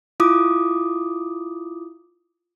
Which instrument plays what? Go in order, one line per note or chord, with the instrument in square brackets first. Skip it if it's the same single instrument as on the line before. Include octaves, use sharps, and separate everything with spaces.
[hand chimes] E4 F4 D6 D#6